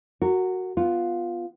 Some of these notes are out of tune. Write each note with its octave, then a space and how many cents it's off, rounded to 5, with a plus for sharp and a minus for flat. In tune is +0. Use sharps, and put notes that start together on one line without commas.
F#4 +0 A#4 -25
B3 +0 F4 +0